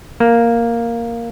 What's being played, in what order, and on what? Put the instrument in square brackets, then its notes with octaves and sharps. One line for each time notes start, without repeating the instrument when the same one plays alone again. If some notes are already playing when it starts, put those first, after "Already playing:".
[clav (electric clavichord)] A#3